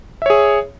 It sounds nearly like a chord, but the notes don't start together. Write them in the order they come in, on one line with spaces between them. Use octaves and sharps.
E5 C#5 G#4